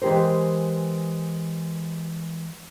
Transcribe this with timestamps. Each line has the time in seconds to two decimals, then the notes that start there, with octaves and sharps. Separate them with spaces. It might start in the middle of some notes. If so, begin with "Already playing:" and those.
0.02 E3 G#3 G4 A#4 C5